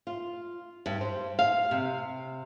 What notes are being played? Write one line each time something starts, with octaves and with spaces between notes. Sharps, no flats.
F4
G2
C5
F5
C3